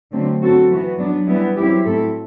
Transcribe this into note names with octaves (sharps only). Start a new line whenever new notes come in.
D3 F#3 A3 C4
F#3 C4 F#4 A4
E3 B3 F#4
F#3 B3 D4
E3 G3 B3 E4
F#3 C4 E4 G4
A2 F#3 C4 E4 A4